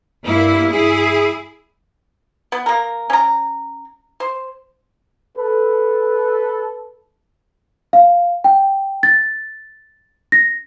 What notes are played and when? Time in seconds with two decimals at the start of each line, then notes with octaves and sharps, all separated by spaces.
0.24 G2 A#3 E4
0.71 E4 G#4
2.52 B3
2.66 A#3 A#4
3.10 C#4 A#5
4.20 C5
5.36 A4 B4
7.93 F5
8.44 G5
9.03 A6
10.32 A#6